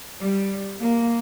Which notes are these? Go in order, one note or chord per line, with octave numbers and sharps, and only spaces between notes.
G3
A#3